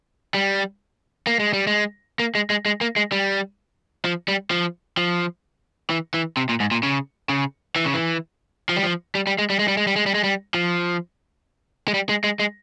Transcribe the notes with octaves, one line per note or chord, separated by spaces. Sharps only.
G3
A#3
G#3
G3
G#3
A#3
G#3
G#3
G#3
A#3
G#3
G3
F3
G3
F3
F3
E3
E3
C3
A#2
G#2
A#2
C#3
C#3
E3
C#3
E3
F3
G3
F3
G3
G3
G#3
G3
G#3
G3
G#3
G3
G#3
G3
G#3
G3
F3
G#3
G3
G#3
G#3
G#3